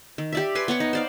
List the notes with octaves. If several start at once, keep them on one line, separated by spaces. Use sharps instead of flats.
D#3
G4 D5 E5
B4 G#5 C6 D6
B3 C#5 F#5 C#6
D#4
C5 D5 F5